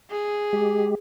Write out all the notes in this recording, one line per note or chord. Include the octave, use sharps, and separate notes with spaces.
G#4
G#3 G4